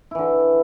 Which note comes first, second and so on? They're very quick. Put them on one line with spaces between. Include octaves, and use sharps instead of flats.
E4 E3 D3